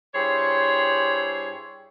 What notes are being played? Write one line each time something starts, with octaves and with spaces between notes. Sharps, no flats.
G2 E4 G4 G#4 C5 C#5